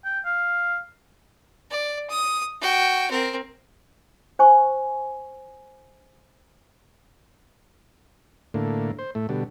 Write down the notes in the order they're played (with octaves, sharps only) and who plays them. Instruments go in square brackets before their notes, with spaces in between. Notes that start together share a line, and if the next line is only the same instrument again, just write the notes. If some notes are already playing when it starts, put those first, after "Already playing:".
[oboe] G5
F5
[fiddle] D5
D#6
F#4 G5
C4 A#4
[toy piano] C5 G#5 C#6
[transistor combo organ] A2 D3 A#3
C5
A2 A3
B2 D3 G3